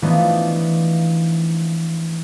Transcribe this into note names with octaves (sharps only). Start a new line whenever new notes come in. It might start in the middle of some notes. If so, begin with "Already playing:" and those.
E3 F3 A3 B3 D4 D#4